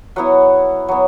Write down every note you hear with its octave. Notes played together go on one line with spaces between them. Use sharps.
F#3 B3 E4 F#5
F#3 B3